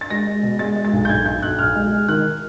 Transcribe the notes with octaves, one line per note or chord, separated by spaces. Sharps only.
A6
G#3 A#6
G#3
B2
G#3 A6
G#3
A6
B1
G6
B1 G#6
B1 G6
B1 F#6
B1 F6
G#3
G#3
D#3 F#6